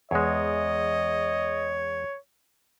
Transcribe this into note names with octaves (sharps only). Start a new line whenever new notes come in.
E2 G#3 C#5 D#5